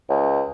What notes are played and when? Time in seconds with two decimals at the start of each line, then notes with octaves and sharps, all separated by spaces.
0.09 C#2